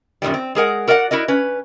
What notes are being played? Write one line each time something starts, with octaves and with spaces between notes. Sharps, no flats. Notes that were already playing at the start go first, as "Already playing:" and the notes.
F#2 A#2 D#3 G3
C4
G#3 G#4 A#4 F#5
F#4 A#4 D5 E5 F#5
E4 F#4 A#4 D#5
C#4 B4